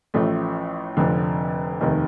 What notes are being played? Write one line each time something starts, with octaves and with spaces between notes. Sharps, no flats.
A1 A2 F3 A3
F1 F2 D3
F1 D#2 D#3